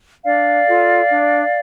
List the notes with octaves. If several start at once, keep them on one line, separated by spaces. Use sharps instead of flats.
D4 D5 F5
F4 A4
D4